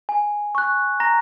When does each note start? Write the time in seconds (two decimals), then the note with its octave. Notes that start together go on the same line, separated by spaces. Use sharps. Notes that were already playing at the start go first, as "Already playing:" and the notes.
0.09 G#5
0.55 C#6 F#6
1.00 A#5 A#6